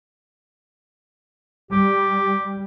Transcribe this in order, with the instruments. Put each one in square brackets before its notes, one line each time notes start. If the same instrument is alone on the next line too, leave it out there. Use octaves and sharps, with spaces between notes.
[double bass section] G3 [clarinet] G4